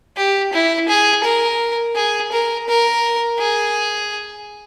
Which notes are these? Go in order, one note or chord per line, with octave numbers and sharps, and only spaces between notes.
G4
E4
G#4
A#4
G#4
A#4
A#4
G#4